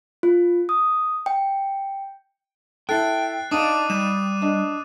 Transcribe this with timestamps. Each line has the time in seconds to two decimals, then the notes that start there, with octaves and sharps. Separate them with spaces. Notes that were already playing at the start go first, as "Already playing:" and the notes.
0.23 F4
0.69 D#6
1.26 G5
2.89 E4 A4 G5 F#6 A6 C7
3.51 D4 D#4 F5 D6 D#6 D#7
3.90 G3 E7
4.42 D4 D#5